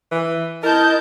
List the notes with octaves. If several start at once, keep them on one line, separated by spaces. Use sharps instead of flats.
E3
E4 A#4 D#5 A5 G6